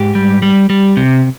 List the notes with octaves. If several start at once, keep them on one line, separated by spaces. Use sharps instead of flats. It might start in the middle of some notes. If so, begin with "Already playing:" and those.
Already playing: G#2 G4
G3
G3
G3
C3